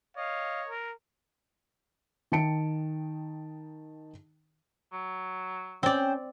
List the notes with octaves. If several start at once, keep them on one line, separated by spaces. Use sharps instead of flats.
C#5 D#5 F5
A#4
D#3 D#4 G5 A5 C#7 D7
F#3
C4 C#4 C5 D5 G5